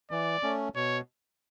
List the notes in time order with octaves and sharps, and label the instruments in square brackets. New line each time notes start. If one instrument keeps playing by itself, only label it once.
[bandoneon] E3 [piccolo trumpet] D5
[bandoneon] A3 C#4
[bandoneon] B2 [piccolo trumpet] C#5